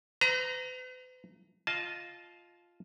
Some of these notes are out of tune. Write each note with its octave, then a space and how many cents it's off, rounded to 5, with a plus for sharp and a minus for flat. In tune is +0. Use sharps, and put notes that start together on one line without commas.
B4 +45 A#5 +0
F4 +0 D#5 +0 A5 -25